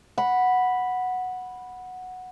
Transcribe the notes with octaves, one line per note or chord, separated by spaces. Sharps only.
F#5 B5